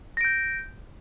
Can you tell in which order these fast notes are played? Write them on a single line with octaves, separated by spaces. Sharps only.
A#6 D7 G6